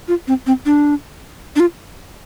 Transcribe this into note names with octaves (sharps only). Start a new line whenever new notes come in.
F4
C4
C4
D4
D4
F4